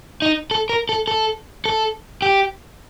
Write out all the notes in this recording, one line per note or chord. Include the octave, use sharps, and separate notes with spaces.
D#4
A4
A#4
A4
A4
A4
G4